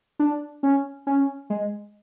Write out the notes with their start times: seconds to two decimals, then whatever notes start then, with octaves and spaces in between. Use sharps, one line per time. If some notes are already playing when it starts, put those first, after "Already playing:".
0.19 D4
0.63 C#4
1.07 C#4
1.50 G#3